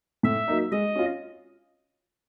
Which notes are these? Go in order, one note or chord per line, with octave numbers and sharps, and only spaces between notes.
A2 E5
F#3 A#3 D#4
G#3 D#5
C#4 F4